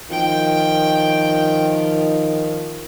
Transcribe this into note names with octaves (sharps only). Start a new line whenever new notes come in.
D#3 F3 G5